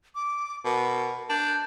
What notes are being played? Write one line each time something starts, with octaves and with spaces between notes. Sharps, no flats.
D6
B2 A#4
D4 G6